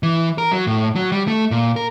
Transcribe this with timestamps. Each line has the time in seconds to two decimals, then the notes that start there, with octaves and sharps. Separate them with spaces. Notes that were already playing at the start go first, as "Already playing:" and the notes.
0.03 E3
0.38 A#4
0.52 F#3
0.67 A2
0.96 F#3
1.12 G3
1.28 A3
1.51 A#2
1.76 A#4